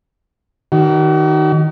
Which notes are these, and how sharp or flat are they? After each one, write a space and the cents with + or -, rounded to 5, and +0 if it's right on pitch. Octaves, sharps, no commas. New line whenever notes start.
D#3 +0 F#4 +45